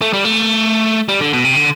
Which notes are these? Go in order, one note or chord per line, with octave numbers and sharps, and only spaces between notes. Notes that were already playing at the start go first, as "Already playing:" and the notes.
A3
G3
A3
G3
D3
B2
C3
D3